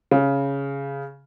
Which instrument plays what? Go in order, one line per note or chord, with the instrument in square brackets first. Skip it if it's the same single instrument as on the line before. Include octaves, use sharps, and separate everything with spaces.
[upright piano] C#3